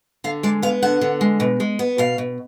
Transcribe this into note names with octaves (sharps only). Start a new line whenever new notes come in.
D3 F5
G#3 D5
B3 F5
D3 F#5
D3
G#3
B2
G#3
B3
B2 F5
B2